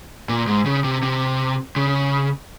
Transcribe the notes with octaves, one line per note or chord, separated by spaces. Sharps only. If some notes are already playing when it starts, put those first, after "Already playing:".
A#2
G#2
C#3
C3
C3
C#3